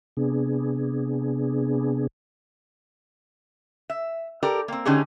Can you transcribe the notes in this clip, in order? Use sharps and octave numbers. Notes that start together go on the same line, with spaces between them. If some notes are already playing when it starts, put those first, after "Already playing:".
C3 B3 D4 G#4
E5
G4 A4 A#4 D5
A#3 C4
D3 A3 C#4 D#4 G4 G#4